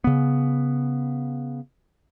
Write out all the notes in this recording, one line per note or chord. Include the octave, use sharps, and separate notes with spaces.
C#3 B3